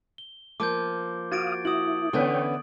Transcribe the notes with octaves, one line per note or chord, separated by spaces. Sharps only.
G7
F3 A#3 D6 G6
F#4 F5 D#6 G#6 A6 D7
E4 F#4 D#6 F#7
D3 E3 B3 C#4 A4 B4 C#5 G5